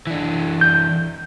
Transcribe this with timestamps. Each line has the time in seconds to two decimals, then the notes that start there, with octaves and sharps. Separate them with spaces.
0.07 E3 D4
0.61 G6